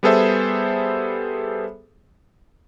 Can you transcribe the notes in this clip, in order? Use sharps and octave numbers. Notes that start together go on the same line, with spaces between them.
G3 B3 G#4 A4 C5 E5